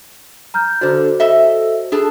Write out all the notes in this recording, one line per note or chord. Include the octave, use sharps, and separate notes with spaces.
A#5 F6 G6
D3 F#4 C5 D5
A4 D#5 E5
D4 G#4 A4